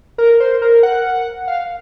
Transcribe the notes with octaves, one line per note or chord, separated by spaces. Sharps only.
A#4
C5
A#4
F#5
F5